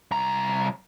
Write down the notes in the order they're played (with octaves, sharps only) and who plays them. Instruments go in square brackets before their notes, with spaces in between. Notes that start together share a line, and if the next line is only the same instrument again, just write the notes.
[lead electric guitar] C2 A#5